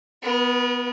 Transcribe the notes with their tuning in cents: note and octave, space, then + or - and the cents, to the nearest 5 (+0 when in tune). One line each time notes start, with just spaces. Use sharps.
B3 +0 B4 -45